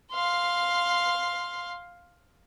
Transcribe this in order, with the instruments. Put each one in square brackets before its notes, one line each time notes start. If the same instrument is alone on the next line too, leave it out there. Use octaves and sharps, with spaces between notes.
[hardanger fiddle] F5 C6